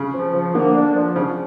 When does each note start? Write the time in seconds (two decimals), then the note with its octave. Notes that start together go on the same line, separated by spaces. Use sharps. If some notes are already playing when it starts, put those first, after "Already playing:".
Already playing: C#3
0.14 F3
0.34 F3
0.55 D3 A#3
0.75 D4
0.95 F3
1.16 C#3 F3